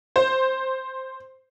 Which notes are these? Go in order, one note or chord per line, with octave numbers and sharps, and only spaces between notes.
C5